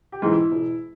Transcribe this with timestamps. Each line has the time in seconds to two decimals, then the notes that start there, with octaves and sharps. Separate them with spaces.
0.12 G4
0.22 G#2 E3
0.32 E4
0.52 E1